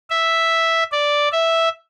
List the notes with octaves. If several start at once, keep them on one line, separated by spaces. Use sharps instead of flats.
E5
D5
E5